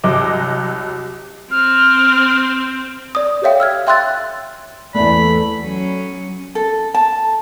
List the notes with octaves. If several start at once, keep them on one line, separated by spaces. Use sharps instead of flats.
C2 F#3 D#5 D6
C4 F6
D5 D#6
G4 A4 C#5 E5 F5 G5
E6 F6 G#6
E5 G5 C6 E6 F#6 A6
E2 A3 D5 B5
A4
F#3 C#4
A4
A5